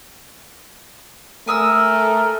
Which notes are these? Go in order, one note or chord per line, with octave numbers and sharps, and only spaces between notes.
A3 A#4 G#5 D#6 E6